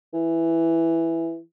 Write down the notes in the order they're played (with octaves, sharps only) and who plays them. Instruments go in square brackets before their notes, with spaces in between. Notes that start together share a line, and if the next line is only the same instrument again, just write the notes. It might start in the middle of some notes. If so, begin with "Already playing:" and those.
[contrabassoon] E3